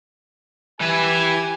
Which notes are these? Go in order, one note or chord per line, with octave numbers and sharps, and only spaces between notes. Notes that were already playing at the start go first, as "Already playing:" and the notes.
E3 G4 B4 G#5